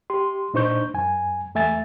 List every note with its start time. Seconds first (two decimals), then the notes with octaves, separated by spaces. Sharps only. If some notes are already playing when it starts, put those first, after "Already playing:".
0.10 G4 C6
0.54 A#2 D4 D#4 C5 C#6 G6
0.94 F#2 G#5
1.55 E2 A3 E5 G#5 A6